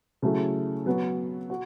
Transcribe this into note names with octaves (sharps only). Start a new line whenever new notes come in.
C#3 F#3 A3 E4
F#3 B3 F#4
F#4